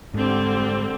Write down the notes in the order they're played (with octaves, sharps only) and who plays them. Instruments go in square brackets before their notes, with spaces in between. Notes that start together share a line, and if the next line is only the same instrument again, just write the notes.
[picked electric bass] G#2 [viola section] D3 G3 C4